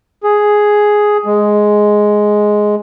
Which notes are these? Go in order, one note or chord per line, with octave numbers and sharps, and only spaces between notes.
G#4
G#3